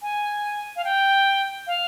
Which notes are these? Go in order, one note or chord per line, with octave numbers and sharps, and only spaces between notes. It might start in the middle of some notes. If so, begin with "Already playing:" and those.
G#5
F5
G5
F5